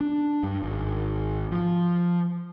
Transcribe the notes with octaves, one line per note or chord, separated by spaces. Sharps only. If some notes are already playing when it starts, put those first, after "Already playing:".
D4
G2
G#1
F3